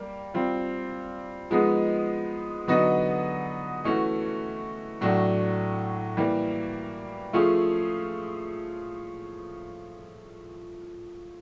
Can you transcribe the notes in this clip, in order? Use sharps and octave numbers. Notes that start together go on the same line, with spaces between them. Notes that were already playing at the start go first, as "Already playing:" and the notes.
Already playing: G3 A#3
G3 C4 F4
F3 G#3 B3 D#4 G#4
D3 F#3 B3 D#4 F#4
E3 A3 C#4 F#4
A2 F#3 A3 D4 F#4
E3 G3 A#3
F3 A3 C#4 F4 G#4